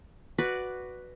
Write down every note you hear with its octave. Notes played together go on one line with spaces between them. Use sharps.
F#4 B4 D5